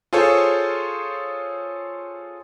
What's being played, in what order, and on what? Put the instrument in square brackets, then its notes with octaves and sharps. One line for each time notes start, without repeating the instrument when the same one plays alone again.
[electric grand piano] F4 G#4 A4 C5 C#5